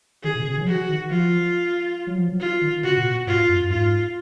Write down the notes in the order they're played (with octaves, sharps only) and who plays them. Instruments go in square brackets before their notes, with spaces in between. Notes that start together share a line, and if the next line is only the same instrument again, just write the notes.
[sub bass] D#3 [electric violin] G#4
[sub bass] B2
C#3
D#3
F#3
[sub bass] F3 [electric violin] F#4
[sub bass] D#3
[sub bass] F3 [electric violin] F4
[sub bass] F#3
F3
F#3
[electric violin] F4
[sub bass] D#3
[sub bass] C#3 [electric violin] F#4
[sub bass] A#2
B2
[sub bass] G#2 [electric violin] F4
[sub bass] F#2
F#2
[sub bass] G#2 [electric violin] F4